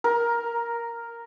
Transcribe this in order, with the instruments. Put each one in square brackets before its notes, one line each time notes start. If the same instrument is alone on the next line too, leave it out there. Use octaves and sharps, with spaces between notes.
[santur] A#4